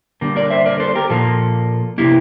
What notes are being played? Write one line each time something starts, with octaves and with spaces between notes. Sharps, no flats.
D3 G3 A#3
A#4 D5
C5 E5
A#4 D5
A4 C5
G4 A#4
A#2 F3 A#3 F4 A4
C3 E3 A#3 E4 G4